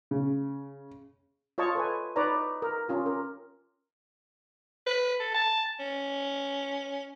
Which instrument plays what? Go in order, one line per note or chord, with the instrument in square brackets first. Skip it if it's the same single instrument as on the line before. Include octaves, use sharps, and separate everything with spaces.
[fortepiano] C#3
[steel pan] F4 C#5 D#5 A5 C#6
A4 B4 G#5
D#4 B4 C#5 D5 A#5
A#4
C#4 F4 G4
A#4
[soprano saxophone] B4
A4
A5
C#4